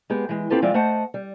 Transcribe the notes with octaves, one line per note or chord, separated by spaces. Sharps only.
G#3 B3 G4 G#4
E3 G#3
C4 F4 G4 A4 B4
F3 G#3 F4 D5 E5 G5
A3 C5 D#5 F#5 A5
G3